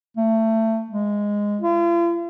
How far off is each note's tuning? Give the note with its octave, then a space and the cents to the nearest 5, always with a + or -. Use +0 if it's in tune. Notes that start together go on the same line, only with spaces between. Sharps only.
A3 +20
G#3 -10
F4 -45